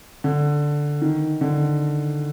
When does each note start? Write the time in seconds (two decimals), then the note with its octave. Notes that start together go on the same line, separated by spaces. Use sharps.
0.24 D3
1.02 D#3
1.41 D3